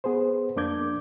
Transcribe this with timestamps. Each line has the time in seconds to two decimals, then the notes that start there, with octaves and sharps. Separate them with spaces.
0.04 B3 G#4 B4 C5
0.56 F2 A#3 D4 D6 G6 G#6